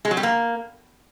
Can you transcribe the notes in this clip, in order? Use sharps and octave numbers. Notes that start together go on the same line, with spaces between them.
G#3
F#3
G3
A#3